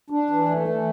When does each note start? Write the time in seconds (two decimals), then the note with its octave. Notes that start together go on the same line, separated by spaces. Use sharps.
0.10 D4
0.30 E3
0.49 A3
0.68 E3